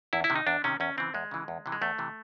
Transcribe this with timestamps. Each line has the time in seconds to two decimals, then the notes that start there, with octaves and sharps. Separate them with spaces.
0.13 E2 E4
0.24 E4
0.30 C3 D#3
0.36 D#4
0.47 E2 D4
0.64 C3 D#3 C#4
0.80 E2 C#4
0.97 C#3 E3 C4
1.14 E2 G#3
1.31 C#3 E3
1.48 E2
1.66 C3 E3
1.72 G#3
1.81 E2 A3
1.98 C3 E3